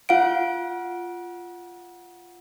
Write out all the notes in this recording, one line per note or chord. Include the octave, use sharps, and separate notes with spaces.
F4 F5 F#5 D7